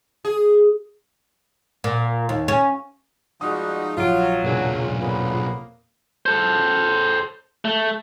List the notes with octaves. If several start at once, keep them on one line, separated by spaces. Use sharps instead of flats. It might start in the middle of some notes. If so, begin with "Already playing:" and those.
G#4
A#2
D#2
C#4
F3 G3 G#3 D#4 F#4 D#6
A#1 F3 F#3 F4 D7
B1 E2 A#2 C#3 A#3 D4 F4
F2 C#3 A#3 B3
A4 C5
A3